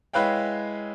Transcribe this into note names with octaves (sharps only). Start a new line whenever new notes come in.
G#3 E4 B4 C#5 F5 G5